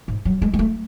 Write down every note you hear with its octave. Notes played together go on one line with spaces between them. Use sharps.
G#2
F#3
G#3
G#3
A3